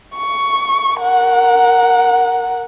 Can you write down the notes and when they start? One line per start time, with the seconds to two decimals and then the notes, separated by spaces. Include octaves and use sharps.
0.17 C#6
0.98 A#4 F#5